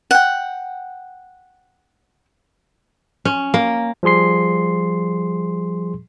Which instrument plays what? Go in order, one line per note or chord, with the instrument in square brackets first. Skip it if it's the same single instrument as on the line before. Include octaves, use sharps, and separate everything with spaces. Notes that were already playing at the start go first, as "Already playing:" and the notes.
[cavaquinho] F#5 G5
[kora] C#4
A#3
[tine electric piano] F3 G3 G#4 C6 C7